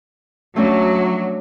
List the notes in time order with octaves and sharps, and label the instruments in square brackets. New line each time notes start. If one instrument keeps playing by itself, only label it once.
[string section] F#3 [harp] A3 C#4 D4